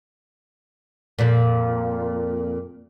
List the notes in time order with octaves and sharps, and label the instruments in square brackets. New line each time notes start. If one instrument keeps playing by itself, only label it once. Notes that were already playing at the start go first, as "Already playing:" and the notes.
[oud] F2 A#2